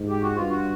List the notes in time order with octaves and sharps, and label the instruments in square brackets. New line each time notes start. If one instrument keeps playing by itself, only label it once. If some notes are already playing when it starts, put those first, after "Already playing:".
Already playing: [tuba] G#2
[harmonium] G4
F#4
[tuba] G2 [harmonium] F4
[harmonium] F#4